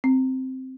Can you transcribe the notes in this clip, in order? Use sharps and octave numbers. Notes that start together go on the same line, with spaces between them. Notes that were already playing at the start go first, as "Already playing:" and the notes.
C4